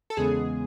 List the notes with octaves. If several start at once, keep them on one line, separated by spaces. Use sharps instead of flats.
A4
E2 C#3 G#3 B3 G#4